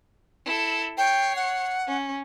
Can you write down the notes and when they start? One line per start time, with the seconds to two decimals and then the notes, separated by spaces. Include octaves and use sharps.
0.46 E4 A4
0.98 C#5 G5 C7
1.36 F#5
1.87 C#4